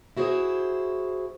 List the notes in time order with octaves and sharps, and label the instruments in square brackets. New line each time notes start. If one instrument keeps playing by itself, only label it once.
[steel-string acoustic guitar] E4 F#4 G#4 C5